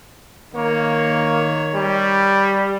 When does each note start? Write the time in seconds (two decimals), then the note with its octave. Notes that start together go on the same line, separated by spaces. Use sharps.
0.55 D#3 A#3 C#5
1.74 G3